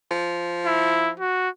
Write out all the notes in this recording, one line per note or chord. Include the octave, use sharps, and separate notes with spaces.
F3
E4
F#4